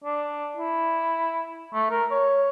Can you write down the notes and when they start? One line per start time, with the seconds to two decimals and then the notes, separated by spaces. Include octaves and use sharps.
0.04 D4
0.57 E4
1.74 A3
1.90 A#4
2.11 C#5